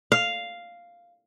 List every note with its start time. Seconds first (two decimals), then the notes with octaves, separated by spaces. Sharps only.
0.12 F5